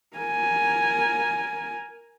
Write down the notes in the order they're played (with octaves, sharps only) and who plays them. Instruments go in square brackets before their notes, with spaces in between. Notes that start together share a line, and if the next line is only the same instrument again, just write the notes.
[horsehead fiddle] A#4 G#5